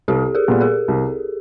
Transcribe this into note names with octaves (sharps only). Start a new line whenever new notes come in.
C2 G4 A4
G#4 A#4
A#2 G3 B3
G#4 A#4
C2